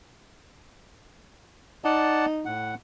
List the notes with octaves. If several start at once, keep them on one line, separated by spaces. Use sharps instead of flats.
D#4 D5 F#5 A5
A2 F#5